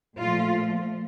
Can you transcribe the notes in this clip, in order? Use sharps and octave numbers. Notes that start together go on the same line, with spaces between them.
A#2 F3 A3 F4